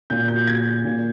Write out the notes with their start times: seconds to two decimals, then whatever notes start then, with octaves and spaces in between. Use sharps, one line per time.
0.10 A#2 G6
0.28 G6
0.47 G#6
0.85 A#2